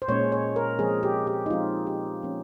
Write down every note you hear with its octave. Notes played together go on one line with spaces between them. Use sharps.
C5
A#2 G#3 C#4 C#5
C#5
A#4
F3 G#3 C4 G#4
G4
G4
D#4
F3 G#3 C4 F4
G4
F3 A#3 C#4